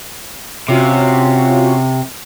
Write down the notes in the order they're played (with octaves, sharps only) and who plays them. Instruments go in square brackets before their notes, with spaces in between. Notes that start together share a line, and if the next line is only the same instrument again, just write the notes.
[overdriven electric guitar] C3 [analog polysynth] C#4 F4 F#4